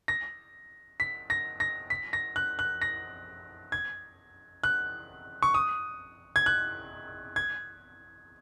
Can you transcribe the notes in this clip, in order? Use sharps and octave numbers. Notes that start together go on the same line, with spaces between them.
A#6
B6
A#6
A#6
B6
A#6
F#6
F#6
A#6
G#6
F#6
C#6
D#6
G#6
F#6
G#6